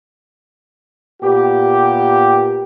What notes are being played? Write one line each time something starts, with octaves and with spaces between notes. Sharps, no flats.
A#2 B3 G4